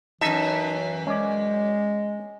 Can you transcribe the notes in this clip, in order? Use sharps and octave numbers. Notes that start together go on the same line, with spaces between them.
F#2 E3 D#4 E5 A5
G#3 C#4 D5